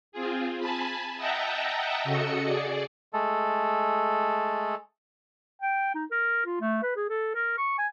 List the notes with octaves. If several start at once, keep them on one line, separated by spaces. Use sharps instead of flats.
C4 F4 G#4
G#5 A5 B5
D#5 E5 F#5 G5 A5 A#5
C#3 F#4 A4 D#5 C#7
G#4 D5
G#3 A3 A4
G5
D#4
A#4
F4
A3
B4
G#4
A4
A#4
C#6
G#5